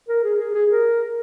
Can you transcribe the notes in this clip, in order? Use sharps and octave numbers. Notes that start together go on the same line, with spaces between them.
A#4
G#4
G#4
G#4
A#4